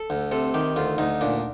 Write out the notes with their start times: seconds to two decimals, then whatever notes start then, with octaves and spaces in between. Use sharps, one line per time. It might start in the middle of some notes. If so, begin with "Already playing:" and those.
Already playing: A4
0.10 D2
0.32 C3 A4
0.54 D#3 G4
0.76 D2 F4
0.98 D2 D#4
1.21 A#2 D4